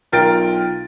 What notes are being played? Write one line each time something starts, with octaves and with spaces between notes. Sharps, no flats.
B1 F4 A#4 G5 A6 D7